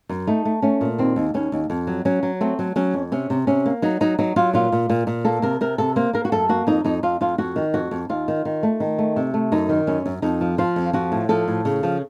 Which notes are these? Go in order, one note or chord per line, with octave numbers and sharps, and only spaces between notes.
F#2
A3 D#4
A3
A3 C#4
A#2
D#2 C4
D#2
D#2 C#4
D#2
F2
F#3
F#3 C#4
F#3
A3 C4
F#3
F#3 C#4
F2
C3 C#4
C3
C3 C#4
A#3
F#3 D#4
F#3 D#4
F#3 D#4
F#3 F4
A#2 F4
A#2
A#2
A#2
A#3 A4
C3 A#4
C3 A#4
C3 A4
A#3 C5
A#3 A#4
F#4
F#2 A4
A#3 F#4
F2 D#4
F2 D#4
F2 F4
F2 F4
F2 F#4
D#3
F2 F#4
F2
D#2 F4
D#3
D#3
A3
D#3
A3
C3
A3
F#2 D#4
D#3
F#2 C#4
F#2
F2 D#4
F3
F3 F4
F2
F3 F#4
A2
F3 A4
A2
C#3
F3